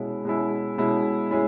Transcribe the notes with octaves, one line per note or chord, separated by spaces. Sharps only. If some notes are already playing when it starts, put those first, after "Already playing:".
Already playing: B2 G#3 C#4 E4
B2 G#3 C#4 E4
B2 G#3 C#4 E4
G#3 C#4 E4